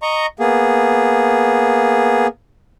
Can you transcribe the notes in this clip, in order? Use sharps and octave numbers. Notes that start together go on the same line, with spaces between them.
D#5 A#5 C#6
A#3 B3 G#4